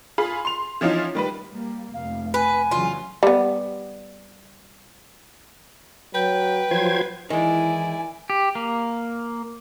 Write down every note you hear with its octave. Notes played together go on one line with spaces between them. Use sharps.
F4 G#4 B5
C6 F7
E3 F3 C#4 D#4 F4
D#3 G3 B4
G3 A#3
F1 F5
B4 G#5
C#3 E3 F#3 F4
G3 B3
F#3 B4 G5
F3 F#3 C5 G#6
D#3 E3 G#3 E4 D5 G#5
G4
A#3